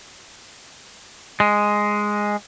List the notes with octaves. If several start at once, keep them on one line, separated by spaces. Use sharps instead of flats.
G#3